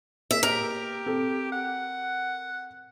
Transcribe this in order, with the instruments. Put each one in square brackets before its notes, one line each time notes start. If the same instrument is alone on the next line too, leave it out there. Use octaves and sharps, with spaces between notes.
[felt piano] A#3 G#4 [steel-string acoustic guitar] E5
[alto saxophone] G4 [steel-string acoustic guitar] A#4
[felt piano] C4 A4
[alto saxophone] F#5